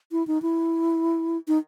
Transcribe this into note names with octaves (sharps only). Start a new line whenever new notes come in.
E4
D#4
E4
D#4